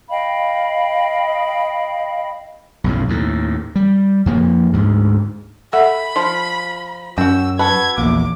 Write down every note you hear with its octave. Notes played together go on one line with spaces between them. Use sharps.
D#5 F5 G5 B5
B1 F#2 A2
D#2 A2
G3
F2 F3 A#3
D2 G#2
A4 E5 F#5 B5
F3 F4 C6
F#2 C#4 F#4 G5 E6
F#4 A4 B4 G#6
A#1 E2 A#3 D6